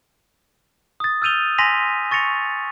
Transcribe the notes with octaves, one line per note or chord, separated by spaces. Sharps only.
D#6 A6
E6 F6 G6 D#7 F7 G7
G#5 C6 A#6 B6 D#7 F7
C#6 A6 A#6 C#7 F7